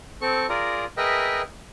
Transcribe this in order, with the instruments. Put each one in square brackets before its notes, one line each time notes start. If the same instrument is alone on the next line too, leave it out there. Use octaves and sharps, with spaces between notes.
[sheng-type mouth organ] C4 A4 C#6
F4 G#4 A#4 D5 A#5
G#4 A#4 B4 D#5 E5 G5